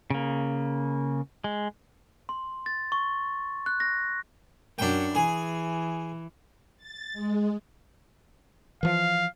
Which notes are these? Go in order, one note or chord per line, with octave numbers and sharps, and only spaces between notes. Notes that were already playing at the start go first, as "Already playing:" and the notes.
C#3 A#3
G#3
C6
A6
C#6
F#6
A#6
F#2 D4 G5
E3 G#4
A6
G#3
E3 F3 F5